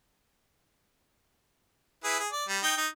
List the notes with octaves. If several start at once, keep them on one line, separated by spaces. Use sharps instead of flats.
E4 G#4 B4
G#4
D5
G3
D#4 G5
D#4